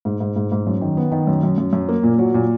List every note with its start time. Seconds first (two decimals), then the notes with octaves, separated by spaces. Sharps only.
0.05 G#2
0.20 G#2
0.36 G#2
0.52 G#2
0.67 F#2
0.81 D#3
0.97 B3
1.12 D#3
1.27 F#2
1.43 F#2
1.58 F#2
1.73 F#2
1.88 A#3
2.03 A#2
2.18 F#3
2.34 A#2